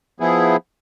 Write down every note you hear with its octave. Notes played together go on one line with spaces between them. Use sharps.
F3 B3 E4 G#4